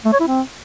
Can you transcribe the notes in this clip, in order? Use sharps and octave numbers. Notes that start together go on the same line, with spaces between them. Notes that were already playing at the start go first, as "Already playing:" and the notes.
A3
C#5
E4
C4